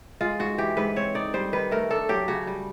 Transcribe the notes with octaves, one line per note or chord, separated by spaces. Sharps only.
G#3 F4
G#2 F#4
E3 G4
G#2 B4
C4 C#5
D#4 D5
G3 C5
D#3 B4
A3 A#4
D4 A4
F#3 G4
C#3 F#4
G3